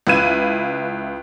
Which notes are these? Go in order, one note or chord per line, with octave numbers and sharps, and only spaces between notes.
C#2 E4 B4 F5 G#6 D#7